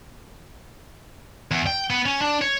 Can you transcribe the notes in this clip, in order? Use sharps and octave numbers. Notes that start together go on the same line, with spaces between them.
E2
G5
B3
C#4
D4
C#5